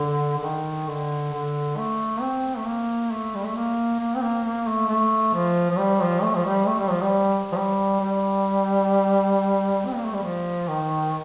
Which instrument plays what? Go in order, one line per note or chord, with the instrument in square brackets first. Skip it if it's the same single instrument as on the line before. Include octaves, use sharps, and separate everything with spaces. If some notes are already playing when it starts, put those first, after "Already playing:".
Already playing: [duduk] D3
D3
D#3
D3
D3
A3
C4
A3
A#3
A3
G3
A3
A#3
A#3
C4
A#3
A#3
A3
A3
F3
F3
G3
F3
A3
F3
G3
A3
G3
F3
G3
F3
G3
G3
C4
A#3
A3
G3
F3
D#3